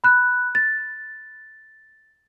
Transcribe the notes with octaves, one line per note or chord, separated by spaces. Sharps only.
B5 F#6
A6